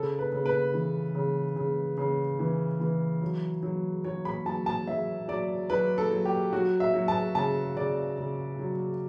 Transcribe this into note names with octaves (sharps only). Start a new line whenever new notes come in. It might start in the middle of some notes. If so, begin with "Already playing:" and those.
Already playing: C#3 A4
B4
C#3
B4
E3
C#3
C#3
C#3
E3
E3
F#3
F#3
F#3 C#5
B5
F#3 A5
A5
F#3 E5
F#3 D5
F#3 B4
A4
F#3
G4
F#3 F#4
E5
F#3
A5
C#3 A5
C#3 D5
C#3
F#3